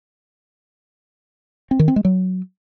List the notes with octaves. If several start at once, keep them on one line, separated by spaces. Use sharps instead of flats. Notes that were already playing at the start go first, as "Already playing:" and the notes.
C4
D#3
C4
G#3
F#3